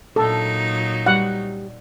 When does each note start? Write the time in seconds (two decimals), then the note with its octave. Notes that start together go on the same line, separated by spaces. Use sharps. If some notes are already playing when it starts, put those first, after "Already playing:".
0.16 A#2 F#3 D#4 A4
1.06 G3 F#5